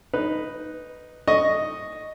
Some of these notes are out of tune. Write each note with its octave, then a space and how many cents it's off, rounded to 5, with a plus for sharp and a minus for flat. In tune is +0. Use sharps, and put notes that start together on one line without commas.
D#4 +0 B4 +0
D#5 +0 C#6 +0